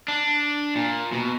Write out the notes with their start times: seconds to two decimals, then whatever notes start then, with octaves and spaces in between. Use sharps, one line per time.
0.08 D4
0.75 A#2
1.12 B2